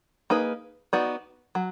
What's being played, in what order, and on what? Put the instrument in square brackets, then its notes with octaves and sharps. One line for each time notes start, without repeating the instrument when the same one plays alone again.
[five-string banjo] A#3 D#4 G#4 B4
B3 D#4 F#4 D5
F#3